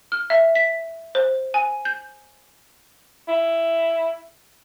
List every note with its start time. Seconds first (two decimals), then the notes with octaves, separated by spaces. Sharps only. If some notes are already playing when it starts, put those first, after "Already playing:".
0.12 F6
0.30 E5
0.55 B6
1.15 C5
1.54 G#5
1.85 G6
3.28 E4